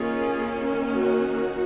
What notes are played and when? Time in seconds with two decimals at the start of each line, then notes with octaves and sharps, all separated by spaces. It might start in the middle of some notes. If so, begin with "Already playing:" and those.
Already playing: D#3 A#3 C#4 F4 G#4
0.93 D#4 F#4